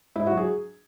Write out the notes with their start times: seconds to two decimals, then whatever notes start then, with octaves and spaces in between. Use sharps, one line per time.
0.16 G#2 E4
0.27 F#4
0.32 F#3
0.37 G#4